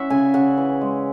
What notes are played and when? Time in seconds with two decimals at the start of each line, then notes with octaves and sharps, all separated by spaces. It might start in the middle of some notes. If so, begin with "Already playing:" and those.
Already playing: C#4 E4 E5 F#5
0.10 C#3 G#5
0.34 C#3 F#5
0.57 E3
0.81 G#3